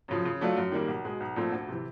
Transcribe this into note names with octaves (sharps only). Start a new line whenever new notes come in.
F#2 C#3 F3
C#3
F#3 A3 D4 F4
F#2
D#3 G3 A#3
B1
B2 G#3
B1
A#2 F3 A3 C4
D2
C3 E3